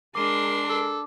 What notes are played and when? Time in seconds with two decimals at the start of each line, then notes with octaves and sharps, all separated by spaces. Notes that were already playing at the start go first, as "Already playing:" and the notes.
0.15 G#3 D4 A#4 C6 D6
0.69 A4